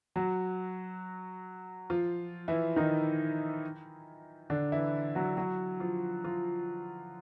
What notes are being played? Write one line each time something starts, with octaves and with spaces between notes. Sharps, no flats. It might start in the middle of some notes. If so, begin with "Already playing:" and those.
F#3 F#4
F3 F4
E3 E4
D#3 D#4
D3 D4
E3 E4
F#3 F#4
F#3 F#4
F3 F4
F3 F4